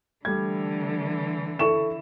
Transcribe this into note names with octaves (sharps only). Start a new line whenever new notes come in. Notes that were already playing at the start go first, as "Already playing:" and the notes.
D3 E3 G3 A3 G#6
E4 A4 C#6 E7